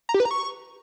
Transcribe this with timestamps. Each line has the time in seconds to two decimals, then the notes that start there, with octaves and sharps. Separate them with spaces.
0.09 A#5
0.14 G4
0.20 B4
0.25 A#5
0.31 C#6